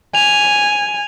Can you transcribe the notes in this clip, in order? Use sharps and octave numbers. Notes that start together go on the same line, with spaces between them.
G#5 F7